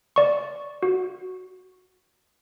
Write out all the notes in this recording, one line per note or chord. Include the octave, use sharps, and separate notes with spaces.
D5 C#6
F#4